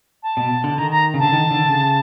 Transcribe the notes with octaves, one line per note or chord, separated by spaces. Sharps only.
A5
B2
D3
D#3 A#5
A#5
C#3
D3 A5
D#3
D3
C#3